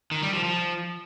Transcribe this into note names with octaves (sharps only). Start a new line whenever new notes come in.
D#3
G3
F3
F3